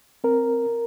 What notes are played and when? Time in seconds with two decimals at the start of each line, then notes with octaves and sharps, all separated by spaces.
0.24 C4 A#4